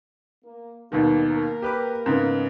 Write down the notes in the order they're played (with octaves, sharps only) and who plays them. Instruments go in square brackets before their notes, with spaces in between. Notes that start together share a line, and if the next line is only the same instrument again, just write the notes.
[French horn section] A#3
[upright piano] D#2 B2 D#3 [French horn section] G3 A#3
[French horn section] A#3 A#4
[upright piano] G4 B4 D6
G#2 C#3 B3